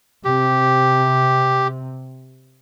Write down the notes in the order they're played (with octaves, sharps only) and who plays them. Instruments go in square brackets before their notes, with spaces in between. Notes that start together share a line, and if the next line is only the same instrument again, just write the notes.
[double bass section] C3 [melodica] G4